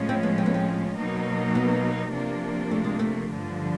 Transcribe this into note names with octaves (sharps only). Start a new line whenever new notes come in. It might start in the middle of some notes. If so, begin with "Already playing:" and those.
Already playing: A2 F3 G#3 C#4
C4
B3
C4
B3
C4
B2 F#3 A#3 D#4
B3
C3 F3 A#3 D4
A3
G#3
A3
G2 D3 F3